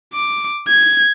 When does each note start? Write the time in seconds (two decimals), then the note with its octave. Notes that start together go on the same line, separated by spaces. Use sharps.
0.14 D6
0.68 G#6